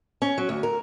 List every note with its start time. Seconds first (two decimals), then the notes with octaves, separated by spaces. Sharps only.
0.22 C#4
0.38 F#3
0.49 D2
0.63 A#4